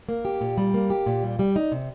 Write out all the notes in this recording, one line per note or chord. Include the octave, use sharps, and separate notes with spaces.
A#3
G4
A#2
G3
A#3
G4
A#2
G3
G3
D#4
C3